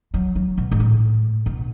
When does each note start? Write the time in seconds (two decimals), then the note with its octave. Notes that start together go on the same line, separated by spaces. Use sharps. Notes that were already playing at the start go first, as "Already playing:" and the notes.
0.14 F#3
0.36 F#3
0.58 B2
0.71 G#2
0.80 A2
1.46 B2